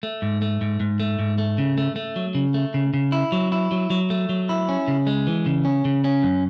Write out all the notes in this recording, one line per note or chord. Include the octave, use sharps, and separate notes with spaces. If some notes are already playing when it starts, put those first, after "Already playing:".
A3
G#2
A3
G#2
G#2
A3
G#2
A3
C#3
A3
A3
F#3
C#3
A3
C#3
C#3
E4
F#3
E4
F#3
F#3
A3
F#3
E4
C#4
C#3
G#3
E3
C#3
C#4
C#3
C#4
F#2